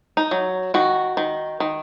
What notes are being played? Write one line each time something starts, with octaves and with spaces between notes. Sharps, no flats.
D#4
F#3
D#3 F#4
D#3
D#3